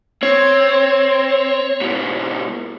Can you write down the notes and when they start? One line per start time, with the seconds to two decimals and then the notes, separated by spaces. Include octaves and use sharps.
0.23 C4 C#5
1.81 G#2 B2